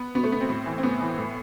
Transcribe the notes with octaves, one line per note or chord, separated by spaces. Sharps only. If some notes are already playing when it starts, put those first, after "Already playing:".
Already playing: B3
B2 B3
A3
B3
C4
A2
E3
C4
A2 B3
E3
A2